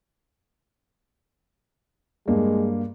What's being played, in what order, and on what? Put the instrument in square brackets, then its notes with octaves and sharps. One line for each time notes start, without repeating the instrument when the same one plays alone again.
[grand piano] G2 A#3 [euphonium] G#3